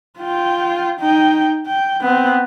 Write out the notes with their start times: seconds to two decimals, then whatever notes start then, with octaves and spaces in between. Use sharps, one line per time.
0.19 F4 G5
1.00 D#4 G5
1.66 G5
2.01 B3 C4